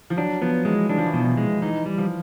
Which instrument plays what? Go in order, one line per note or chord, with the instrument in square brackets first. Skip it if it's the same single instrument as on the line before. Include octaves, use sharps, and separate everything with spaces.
[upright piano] F3
[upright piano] F#3 [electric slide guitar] D4
[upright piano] F3 [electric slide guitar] B3
[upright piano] E3 [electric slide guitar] G#3
[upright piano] E3 [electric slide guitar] D4
[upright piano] F3
E3
[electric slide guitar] B2
[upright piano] E3
[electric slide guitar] G#3
[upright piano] E3 [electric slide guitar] D#4
[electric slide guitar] G3
[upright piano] F3